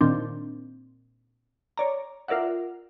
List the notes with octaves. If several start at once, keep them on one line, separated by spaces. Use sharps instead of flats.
A#2 D#3 C4 D4
C#5 D5 A#5
F4 A#4 D5 E5 F#5